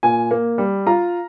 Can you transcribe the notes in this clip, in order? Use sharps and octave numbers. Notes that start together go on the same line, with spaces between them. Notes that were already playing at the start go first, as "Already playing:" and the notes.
A#2 G#5
A#3
G3
F4 A#5